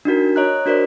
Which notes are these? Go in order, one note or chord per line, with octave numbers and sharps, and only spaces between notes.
D4 D#4 F#4 A#4
C#5 D#5 A#5 F#6
D4 F#4 A#4 C5 D5